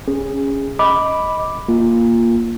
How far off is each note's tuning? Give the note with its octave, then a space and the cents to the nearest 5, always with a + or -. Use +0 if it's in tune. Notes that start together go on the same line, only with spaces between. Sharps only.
C#4 +0 G#4 -20
D#5 +15 B5 +0 D6 +0
A#3 +0 F4 -5